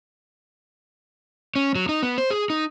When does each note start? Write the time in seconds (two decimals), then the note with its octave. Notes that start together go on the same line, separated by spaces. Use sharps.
1.56 C#4
1.75 F#3
1.89 D#4
2.02 B3
2.18 C5
2.31 G#4
2.50 D#4